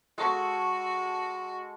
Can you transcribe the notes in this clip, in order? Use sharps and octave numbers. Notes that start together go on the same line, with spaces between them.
G#3 F#4 A4 C#6